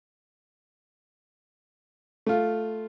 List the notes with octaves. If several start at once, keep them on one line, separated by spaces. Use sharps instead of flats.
A3 F4